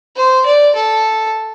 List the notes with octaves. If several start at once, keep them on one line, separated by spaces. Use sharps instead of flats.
C5
D5
A4